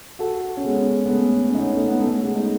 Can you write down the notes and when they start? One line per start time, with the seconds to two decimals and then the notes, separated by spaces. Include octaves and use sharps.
0.19 F#4 A4
0.57 C#4
0.64 G#3 B3
1.05 B3
1.10 A3 C#4
1.50 C#4
1.55 B3 D#4
1.76 A3
1.88 B3
2.00 A3 C#4
2.22 G#3 B3
2.36 D#4